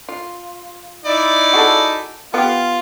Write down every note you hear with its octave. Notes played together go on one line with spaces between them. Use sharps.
F4
D#4 E4 D5
F#4 G#4 A4
B3 F4 G4